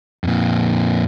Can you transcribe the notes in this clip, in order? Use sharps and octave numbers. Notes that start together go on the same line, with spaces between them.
F2 A#2